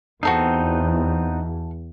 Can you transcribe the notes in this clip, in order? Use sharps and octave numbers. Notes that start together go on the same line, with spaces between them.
E2 B3 C4 D#4 F#4 A4 F5